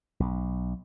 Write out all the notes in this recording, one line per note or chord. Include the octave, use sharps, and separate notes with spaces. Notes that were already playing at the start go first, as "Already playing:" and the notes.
B1